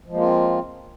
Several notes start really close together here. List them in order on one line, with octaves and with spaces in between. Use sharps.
F3 G#3 A#3 F4 C4